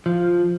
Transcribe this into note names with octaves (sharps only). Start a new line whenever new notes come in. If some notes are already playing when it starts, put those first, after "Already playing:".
F3